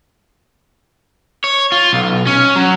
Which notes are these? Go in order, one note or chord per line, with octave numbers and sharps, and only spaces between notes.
C#5
F4
B1
C#4
F#3